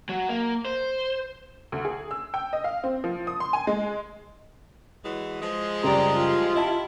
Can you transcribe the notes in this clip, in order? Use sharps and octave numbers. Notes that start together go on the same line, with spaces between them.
F#3
A#3
C5
D2
G#4
E6
G5
D#5
F5
C4
F3
D#6
C6
G#5
G#3
E3 F#3 G#3
F3 G#3
F#1 G3 D5 G5 A#5 C6
F4 G4
E4 D#5 F5 A5